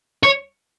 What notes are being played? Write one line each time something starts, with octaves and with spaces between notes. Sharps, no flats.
C#5